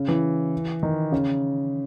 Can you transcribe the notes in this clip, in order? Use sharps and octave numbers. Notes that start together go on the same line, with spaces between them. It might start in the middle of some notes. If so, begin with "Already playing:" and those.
Already playing: C#3
E3
D#3
C#3